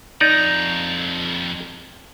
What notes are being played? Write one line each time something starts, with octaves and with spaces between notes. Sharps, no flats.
F2 D#4 D5 A#5